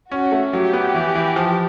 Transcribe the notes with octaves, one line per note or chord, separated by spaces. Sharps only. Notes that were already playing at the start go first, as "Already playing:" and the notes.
C#4 F#4
A3
F#3 G4
B3
E3
E3
F3